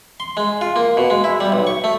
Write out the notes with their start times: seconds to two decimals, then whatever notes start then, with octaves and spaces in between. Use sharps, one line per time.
0.20 C6
0.37 G#3
0.61 F4
0.76 A#3
0.97 B2
1.10 G#3
1.24 E4
1.40 G3
1.52 B1
1.67 C#6
1.84 A3